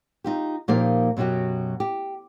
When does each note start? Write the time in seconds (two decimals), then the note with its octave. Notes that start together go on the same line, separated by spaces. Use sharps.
0.24 D#4 F4 G4
0.68 A#2 F3 A#3 D#4 G4 F5
1.17 F#2 B2 F#3 F#4 G4
1.80 G4